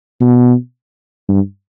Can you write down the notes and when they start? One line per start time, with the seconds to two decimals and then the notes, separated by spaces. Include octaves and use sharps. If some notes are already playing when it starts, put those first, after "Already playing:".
0.20 B2
1.29 G2